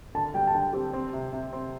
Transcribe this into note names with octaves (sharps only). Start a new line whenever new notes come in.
D3 A5
G3 G5
A5
D3 G5
C4 G4
C4
C3
C3
C4